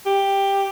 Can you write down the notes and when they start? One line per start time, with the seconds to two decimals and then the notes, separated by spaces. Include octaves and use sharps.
0.06 G4